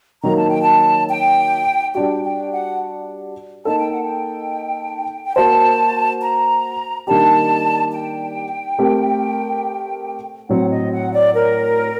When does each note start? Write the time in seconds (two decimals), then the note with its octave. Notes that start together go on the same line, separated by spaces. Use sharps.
0.23 D#3 F#3 A#3 A#5
0.36 A5
0.49 G5
0.62 A5
1.09 G5
1.94 G3 D4 F#4 G5
2.23 G5
2.52 F#5
3.65 A#3 D#4 A4 A5
3.78 G5
3.91 F#5
4.03 G5
5.25 G5
5.36 A#3 F#4 C5 A5
6.22 A#5
7.07 D#3 G3 A#3 D4 G4 A5
7.92 G5
8.79 A3 C4 G4 A#4
10.49 A2 F#3 C4 F#5
10.71 D#5
10.92 F#5
11.13 D5
11.34 A#4